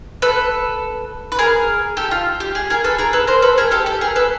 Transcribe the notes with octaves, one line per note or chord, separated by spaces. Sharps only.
A4 B4
B4
G#4 A#4
G4 A4
F4
G4
G#4
G#4 A#4
A4 B4
G#4 A#4
A4 B4
A#4 C5
A4 B4
G#4 A#4
G4 A4
G4 A4
G#4 A#4
A4 B4